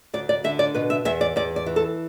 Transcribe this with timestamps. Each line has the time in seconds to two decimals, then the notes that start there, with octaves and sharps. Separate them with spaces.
0.13 D2 D5
0.29 D5
0.44 D3 E5
0.59 D5
0.75 B2 B4
0.90 E5
1.05 E2 E5
1.21 D5
1.36 E2 D5
1.56 D5
1.66 E3
1.76 A4